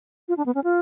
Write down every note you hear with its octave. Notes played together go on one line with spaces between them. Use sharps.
F4
D4
B3
C#4
F4